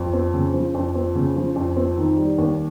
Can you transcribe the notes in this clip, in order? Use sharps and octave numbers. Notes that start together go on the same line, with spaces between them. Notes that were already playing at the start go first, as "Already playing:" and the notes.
Already playing: F2
C4
C#3
F3
F2
C4
C#3
F3
F2
C4
D#3
G3
D#2